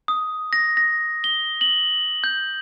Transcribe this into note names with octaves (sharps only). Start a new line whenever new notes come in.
D#6
A#6
A#6
G7
F#7
G6